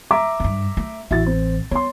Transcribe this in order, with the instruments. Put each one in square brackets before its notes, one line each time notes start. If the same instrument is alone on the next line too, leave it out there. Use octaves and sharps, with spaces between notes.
[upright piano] E5 A#5 D6
[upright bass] G2 C#4
A3
[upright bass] A1 E3 [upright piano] E4 F#4 A6
[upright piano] C4
[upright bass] B3 [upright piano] C#5 C6